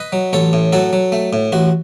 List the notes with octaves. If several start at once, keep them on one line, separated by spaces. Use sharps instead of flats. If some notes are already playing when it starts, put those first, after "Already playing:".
Already playing: B4 D#5
F#3
A1 A4 C#5
A2
F#3 F#4 A4
F#3
A3
A2
A1 F#4